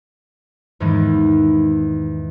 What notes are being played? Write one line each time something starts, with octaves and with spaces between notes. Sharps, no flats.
E2 G#2 D#3 E3 G#3